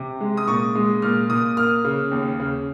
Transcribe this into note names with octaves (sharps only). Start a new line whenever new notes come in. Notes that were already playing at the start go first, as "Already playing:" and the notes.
Already playing: C3
G#3
D#6
A#2 C#6
G#3
A#2 F6
A#2 D#6
A#3 F6
C#3
D#2
C#3